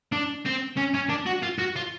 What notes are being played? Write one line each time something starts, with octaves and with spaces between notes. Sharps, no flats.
D4
C4
C#4
C#4
D4
F#4
F4
F#4
F4